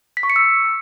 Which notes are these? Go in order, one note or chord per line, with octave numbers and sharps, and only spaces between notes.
B6
C#6
C#7
E6